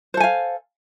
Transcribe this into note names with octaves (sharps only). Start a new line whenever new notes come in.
A4 C5 F5 G#5